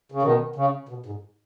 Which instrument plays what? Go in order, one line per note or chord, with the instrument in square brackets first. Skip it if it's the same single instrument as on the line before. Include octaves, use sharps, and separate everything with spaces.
[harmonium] C#3
B2 D#3
C#3
B2
G#2